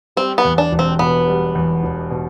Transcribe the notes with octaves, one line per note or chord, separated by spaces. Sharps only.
G3 C4
B3
E2
D4
E1
C4
B2 B3
G3
E2
E1
B2